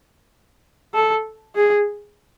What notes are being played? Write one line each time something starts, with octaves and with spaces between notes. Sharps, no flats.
A4
G#4